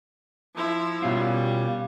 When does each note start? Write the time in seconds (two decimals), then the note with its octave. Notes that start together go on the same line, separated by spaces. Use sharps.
0.55 F3 E4
1.02 B2 G3 C#4 F4